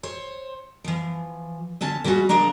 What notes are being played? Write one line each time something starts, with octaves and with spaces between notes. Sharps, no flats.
C5 C#5
E3 F3
D2 D3 C#4 A5
D3 G3 G#3 C#4 F#4
C#3 F3 A#3 D4 A#5